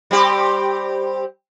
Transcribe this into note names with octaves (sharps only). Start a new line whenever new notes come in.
G3 C4 G4